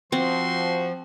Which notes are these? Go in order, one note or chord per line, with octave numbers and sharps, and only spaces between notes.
F3 C4 F#4 C6